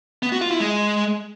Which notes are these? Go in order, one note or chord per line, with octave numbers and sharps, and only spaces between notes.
B3
F#4
F4
E4
G#3